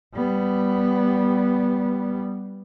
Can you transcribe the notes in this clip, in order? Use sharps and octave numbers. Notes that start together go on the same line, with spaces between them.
G3 B3